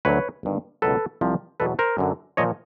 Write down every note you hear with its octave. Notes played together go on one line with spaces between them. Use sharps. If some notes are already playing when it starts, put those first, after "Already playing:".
D2 D3 F#3 B4 C#5
G1 G2 D#3
C#2 B2 F#3 A4 B4
C2 C3 F3
E2 B2 F#3 A4 B4
A#4 C5
F#2 D3 F#3
A#2 F3 C#5 D#5